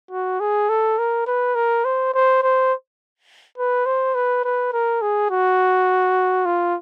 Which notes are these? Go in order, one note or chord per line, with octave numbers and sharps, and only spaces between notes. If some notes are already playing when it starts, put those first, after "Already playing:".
F#4
G#4
A4
A#4
B4
A#4
C5
C5
C5
B4
C5
B4
B4
A#4
G#4
F#4
F4